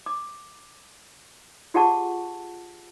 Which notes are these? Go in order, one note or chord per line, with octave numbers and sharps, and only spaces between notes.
D6
F4 G4 G#4 F#5 A5 C#6